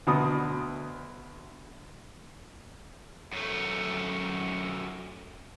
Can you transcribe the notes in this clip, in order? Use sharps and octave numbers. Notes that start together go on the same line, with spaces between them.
D2 B2 D#6
F#2 A3